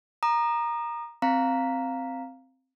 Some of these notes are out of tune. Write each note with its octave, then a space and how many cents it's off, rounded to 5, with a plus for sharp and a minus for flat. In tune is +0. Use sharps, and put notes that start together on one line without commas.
A#5 +10 D#6 -35
C4 +0 F5 +0 A#5 +0